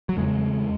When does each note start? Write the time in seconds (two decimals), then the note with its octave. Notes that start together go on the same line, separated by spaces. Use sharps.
0.09 F#3
0.17 E2 C#3 G#3